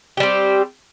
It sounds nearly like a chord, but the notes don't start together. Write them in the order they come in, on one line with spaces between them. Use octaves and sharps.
G4 G3 C4